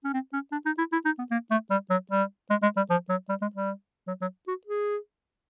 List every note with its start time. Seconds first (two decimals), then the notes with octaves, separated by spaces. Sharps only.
0.04 C#4
0.13 C4
0.33 C#4
0.52 D4
0.66 D#4
0.78 E4
0.92 E4
1.05 D#4
1.19 B3
1.31 A#3
1.51 A3
1.70 G3
1.90 F#3
2.11 G3
2.50 G#3
2.62 G#3
2.77 G3
2.90 F3
3.10 F#3
3.29 G3
3.42 G#3
3.55 G3
4.07 F#3
4.21 F#3
4.48 F#4
4.67 G#4